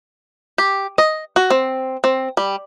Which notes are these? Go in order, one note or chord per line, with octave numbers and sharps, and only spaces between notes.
G4
D#5
F#4
C4
C4
G3